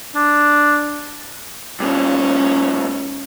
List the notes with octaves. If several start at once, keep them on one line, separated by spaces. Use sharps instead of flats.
D4
G2 A#2 C#4